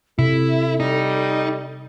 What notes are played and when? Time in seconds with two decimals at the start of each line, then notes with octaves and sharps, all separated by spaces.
0.19 C3 E4 A4
0.80 G3 D#4